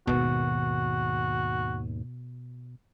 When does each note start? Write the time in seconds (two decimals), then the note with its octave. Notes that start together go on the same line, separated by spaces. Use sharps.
0.07 G#1 D#2 B2 F#4